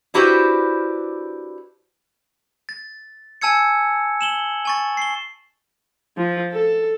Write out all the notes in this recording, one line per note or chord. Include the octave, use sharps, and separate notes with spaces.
D4 E4 F#4 G4 B4 C5
A6
G#5 A5 E6 G#6 C#7
E7 F#7 G7
G#5 C#6 A6
C7 G7
F3
A4